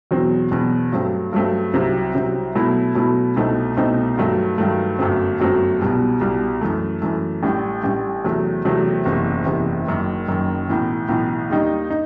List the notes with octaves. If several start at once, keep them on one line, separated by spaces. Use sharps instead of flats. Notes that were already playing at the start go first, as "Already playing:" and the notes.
E2 B2 F#3 C4
E2 B2 F#3 C4
G2 F#3 A3 C4
G2 F#3 A3 C4
C2 C3 F#3 C4
C2 C3 F#3 C4
B2 F#3 A3 E4
B2 F#3 A3 E4
C2 B2 A3 C4 D#4
C2 B2 A3 C4 D#4
G2 D#3 F#3 A3
G2 D#3 F#3 A3
G1 F#2 F#3 A3 C4
G1 F#2 F#3 A3 C4
C2 B2 G3
C2 B2 G3
F#2 E3 A3
F#2 E3 A3
A1 A2 G3
A1 A2 G3
E2 C3 F#3 A3
E2 C3 F#3 A3
F#1 E2 C3
F#1 E2 C3
F#1 F#2 D#3
F#1 F#2 D#3
B1 A2 E3
B1 A2 E3
D#2 D#3 G3 D#4
D#4